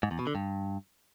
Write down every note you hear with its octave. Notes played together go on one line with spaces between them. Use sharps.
G#2
E2
B2
D3
G2